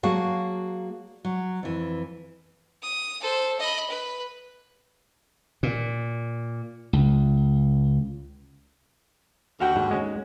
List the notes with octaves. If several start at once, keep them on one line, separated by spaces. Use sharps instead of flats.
F#3 A#3 F#4 G#4 F5 A5
F#3
F2 E3
D#6
A4 C5
D#5 B5
B4
A#2
C#2
D#2 D3 F#4 F5 G5
G#2
G#3 C#4